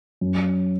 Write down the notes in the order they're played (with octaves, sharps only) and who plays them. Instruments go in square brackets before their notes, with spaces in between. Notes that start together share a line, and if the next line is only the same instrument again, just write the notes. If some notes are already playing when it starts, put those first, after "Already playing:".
[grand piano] F#2